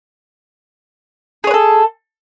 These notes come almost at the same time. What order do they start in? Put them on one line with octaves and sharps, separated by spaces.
G#4 C#5 B4 A4